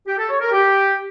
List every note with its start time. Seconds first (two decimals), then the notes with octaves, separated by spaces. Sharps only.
0.07 G4
0.18 A4
0.30 C#5
0.41 A#4
0.52 G4